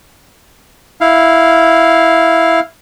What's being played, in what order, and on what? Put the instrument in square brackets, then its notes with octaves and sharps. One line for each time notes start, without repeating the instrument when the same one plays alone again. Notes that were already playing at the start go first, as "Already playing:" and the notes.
[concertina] E4 F5